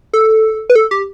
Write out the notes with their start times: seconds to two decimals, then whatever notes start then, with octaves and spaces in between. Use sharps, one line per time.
0.13 A4
0.70 B4
0.75 A4
0.91 G4